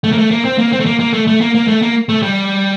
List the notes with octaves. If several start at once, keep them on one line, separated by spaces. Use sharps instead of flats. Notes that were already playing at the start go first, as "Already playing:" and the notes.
A3
A#3
A3
A#3
C4
A#3
C4
A3
A#3
A#3
A3
A3
A#3
A#3
A3
A#3
A3
G3